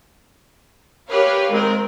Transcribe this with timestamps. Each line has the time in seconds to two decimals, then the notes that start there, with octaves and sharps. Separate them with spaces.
1.09 G4 A#4 B4 C#5 F5
1.49 D#3 G#3 C4 A#4